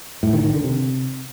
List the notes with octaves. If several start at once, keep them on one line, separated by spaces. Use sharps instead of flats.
A2
D#3
D#3
D3
C3